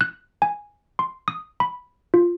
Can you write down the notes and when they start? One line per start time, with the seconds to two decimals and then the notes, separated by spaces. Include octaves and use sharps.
0.01 F#6
0.42 G#5
0.99 C6
1.28 D#6
1.60 B5
2.14 F4